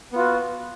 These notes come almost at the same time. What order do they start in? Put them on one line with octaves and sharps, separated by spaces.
B3 F4 F#4